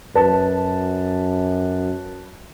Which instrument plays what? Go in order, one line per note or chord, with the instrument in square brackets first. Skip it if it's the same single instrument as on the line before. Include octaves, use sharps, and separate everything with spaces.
[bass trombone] F#2 [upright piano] B4 A5